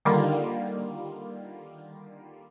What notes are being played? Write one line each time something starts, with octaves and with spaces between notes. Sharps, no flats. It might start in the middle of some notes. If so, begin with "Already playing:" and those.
D3 D#3 G3 A#3 F4